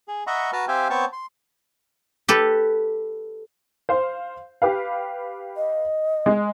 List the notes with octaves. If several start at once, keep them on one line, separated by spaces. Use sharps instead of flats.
G#4
D#5 E5 F#5 A#5 B5 C#6
F#4 B4 A5 A#5 F6
C4 G4 E5 F5 G5 G#5
B3 C4 C#5 G5 A5 C#6
C6
G4 A4 B4
C5 F5 C6
G4 B4 F5
D#5
G#3